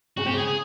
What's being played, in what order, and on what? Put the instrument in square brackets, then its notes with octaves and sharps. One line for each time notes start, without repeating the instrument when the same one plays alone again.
[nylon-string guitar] C#3 [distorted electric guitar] F#4
[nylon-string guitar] C3 [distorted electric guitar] G4
[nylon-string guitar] C#3 [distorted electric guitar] G#4
[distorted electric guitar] G#4